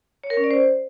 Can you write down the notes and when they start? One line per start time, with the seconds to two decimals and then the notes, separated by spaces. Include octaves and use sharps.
0.24 C#5
0.30 A#4
0.37 C#4
0.44 D5
0.51 C5